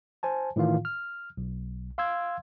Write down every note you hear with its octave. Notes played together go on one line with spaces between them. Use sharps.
C5 G#5 A5
A2 D#3 E3 F4 F5
F6
B1
F5 C6 E6 G#6